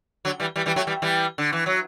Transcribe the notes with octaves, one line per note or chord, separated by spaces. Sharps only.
D3 F#3
E3 G3
E3 G3
E3 G3
F#3 A3
E3 G3
E3 G3
D3
E3
F#3